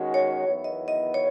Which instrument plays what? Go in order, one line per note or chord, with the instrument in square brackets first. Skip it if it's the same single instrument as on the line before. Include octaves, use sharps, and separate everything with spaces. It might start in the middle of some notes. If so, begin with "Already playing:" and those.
Already playing: [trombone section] D#3 G#3 C#4 F#4
[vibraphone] C#5
[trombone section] E2 D#3 F#3 B3 E4
[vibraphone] D#5
D#5
C#5